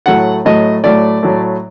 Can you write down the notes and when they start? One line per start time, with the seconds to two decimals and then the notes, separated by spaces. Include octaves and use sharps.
0.06 A2 F#3 A3 F#5
0.45 A2 F#3 A3 D#5
0.84 A2 F#3 A3 D5
1.23 A2 F#3 A3